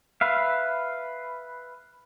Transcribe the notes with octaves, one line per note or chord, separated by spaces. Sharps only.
B4 E5 F5